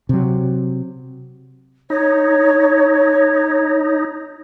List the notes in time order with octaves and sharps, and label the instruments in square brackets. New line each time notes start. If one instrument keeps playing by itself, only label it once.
[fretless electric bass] C3 F#3
[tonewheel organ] D#4 [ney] C#5